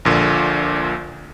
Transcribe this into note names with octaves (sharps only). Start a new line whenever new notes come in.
A#1 A#2 D3